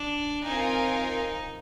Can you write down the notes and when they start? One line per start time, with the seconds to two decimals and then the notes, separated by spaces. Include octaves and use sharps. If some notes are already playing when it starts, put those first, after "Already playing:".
Already playing: D4
0.44 C4 D#4 F4 A#4 F5 G#5